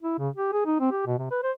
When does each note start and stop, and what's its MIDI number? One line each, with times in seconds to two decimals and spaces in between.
0.02 0.16 64
0.18 0.29 49
0.36 0.52 67
0.52 0.61 68
0.65 0.77 63
0.80 0.91 60
0.91 1.03 67
1.06 1.17 47
1.18 1.27 48
1.31 1.42 71
1.43 1.51 72